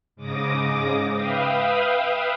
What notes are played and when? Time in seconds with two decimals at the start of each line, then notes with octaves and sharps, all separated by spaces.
0.16 G#2 C#3 D6 D#6 A#6
1.13 B4 E5 F5 G5 D#6